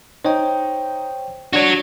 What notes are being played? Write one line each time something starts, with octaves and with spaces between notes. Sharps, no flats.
D#4 C5 C#5 G5
D4 F#4 C#5